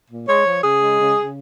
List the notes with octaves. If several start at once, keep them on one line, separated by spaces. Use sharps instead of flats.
A#2
G#3 C#5
F3
C#3 G#4
G#3
C#3
C#3